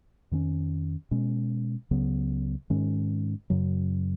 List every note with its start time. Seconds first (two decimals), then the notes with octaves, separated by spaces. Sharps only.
0.32 F2 D#3 A#3 C#4
1.11 B2 G#3 C#4
1.91 C#2 C#3 F#3 B3
2.70 G#2 D#3 G#3 C#4
3.50 F#2 C#3 F#3